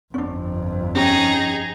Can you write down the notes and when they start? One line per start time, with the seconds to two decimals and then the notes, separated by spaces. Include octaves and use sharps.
0.14 G1 F2 C#4 D4
0.95 C#4 D#4 G4 G#4